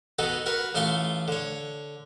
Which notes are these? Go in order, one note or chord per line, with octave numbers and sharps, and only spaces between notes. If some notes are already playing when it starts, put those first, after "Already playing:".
B3 D#4 F#4 A4
F#4 A#4 B4
A1 A3 F4 C6 C#6
D3 C#5